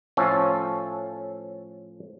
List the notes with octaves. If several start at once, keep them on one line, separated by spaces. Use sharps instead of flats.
A2 F3 C#4 A4